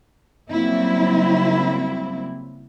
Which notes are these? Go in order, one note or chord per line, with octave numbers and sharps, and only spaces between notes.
C#3 F#3 G3 A#3 C4 E4